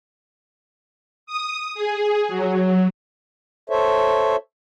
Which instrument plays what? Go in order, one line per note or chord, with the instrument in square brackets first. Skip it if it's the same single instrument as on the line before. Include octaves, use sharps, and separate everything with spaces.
[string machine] D#6
G#4
F#3
[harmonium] A4 C5 C#5 E5